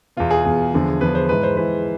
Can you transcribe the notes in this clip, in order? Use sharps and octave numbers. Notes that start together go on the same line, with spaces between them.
E2 B2 F4
G#4
E2 B2
E2 D3 F3
E2 D3 F3 B4
C5
G#2 E3 B4
C5
G#2 E3 B4